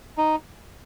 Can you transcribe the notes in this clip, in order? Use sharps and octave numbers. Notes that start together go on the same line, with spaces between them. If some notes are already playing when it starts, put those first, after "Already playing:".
D#4